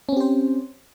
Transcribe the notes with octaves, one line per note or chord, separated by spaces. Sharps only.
C4 C#4 G4 C5